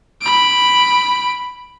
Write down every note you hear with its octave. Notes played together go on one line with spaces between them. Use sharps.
B5 D7